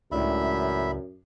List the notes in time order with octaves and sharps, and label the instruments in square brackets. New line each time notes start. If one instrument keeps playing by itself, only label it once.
[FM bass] C#2 [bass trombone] F#2 [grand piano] A2 D4 [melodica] E5 B5